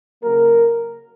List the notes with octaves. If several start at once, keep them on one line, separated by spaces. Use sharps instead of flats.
C#3 F#3 A#3 A#4